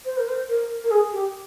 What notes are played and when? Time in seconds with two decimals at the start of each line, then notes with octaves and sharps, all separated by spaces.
0.05 C5
0.18 A#4
0.28 C5
0.49 A#4
0.84 A#4
0.91 G#4
1.12 G4